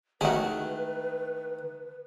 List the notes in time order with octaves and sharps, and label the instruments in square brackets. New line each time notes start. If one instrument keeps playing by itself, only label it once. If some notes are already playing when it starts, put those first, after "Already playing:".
[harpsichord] D#3 A3 E4 [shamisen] G#3 F#4 [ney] B4